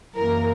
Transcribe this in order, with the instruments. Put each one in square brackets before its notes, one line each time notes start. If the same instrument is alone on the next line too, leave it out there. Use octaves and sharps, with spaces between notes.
[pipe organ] F#2 E3 A#3 [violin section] A#4